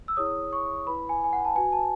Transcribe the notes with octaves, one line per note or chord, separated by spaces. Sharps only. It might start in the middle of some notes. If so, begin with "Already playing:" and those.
E6
E4 G#4 C#5 D#6
C#6
E4 B4 B5
G#5
G#5
F#5
A5
F#4 B4 G#5
A5